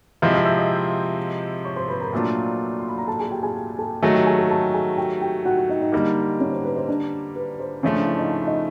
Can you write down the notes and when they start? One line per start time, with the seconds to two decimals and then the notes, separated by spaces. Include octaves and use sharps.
0.22 C3 F3 G#3 C4 E4 F5 F6
0.34 F5 F6
0.46 E5 E6
0.58 D#5 D#6
1.65 C#5 C#6
1.76 C5 C6
1.89 B4 B5
2.00 A#4 A#5
2.13 A#2 F#3 A3 D4 F4
2.79 C6
2.89 B5
2.98 A#5
3.08 A4 A5
3.20 G#4 G#5
3.31 G4 G5
3.43 G#4 G#5
3.79 A4 A5
4.03 D#3 F#3 A3 G#4 G#5
4.15 G4 G5
4.26 G#4 G#5
4.38 A4 A5
4.50 A4 A5
4.74 G#4 G#5
4.98 G4 G5
5.21 G4 G5
5.45 F#4 F#5
5.57 F#4 F#5
5.69 D#4 D#5
5.81 D#4 D#5
5.92 D3 G3 A#3 D#4 D#5
6.40 C#4 C#5
6.52 C5
6.64 B4
6.76 C5
6.88 D4 D5
7.36 B4
7.60 C5
7.83 C#3 F3 A3 C#4 C#5
7.95 D4 D5
8.07 E4 E5
8.19 D#4 D#5
8.46 D#4 D#5